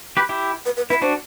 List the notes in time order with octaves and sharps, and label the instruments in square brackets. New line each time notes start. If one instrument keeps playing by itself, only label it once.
[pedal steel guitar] G4 B4
E4 G4
[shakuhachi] B4
B4
[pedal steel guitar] E4 [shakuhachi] B4
[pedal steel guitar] D4 F#4 [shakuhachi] C5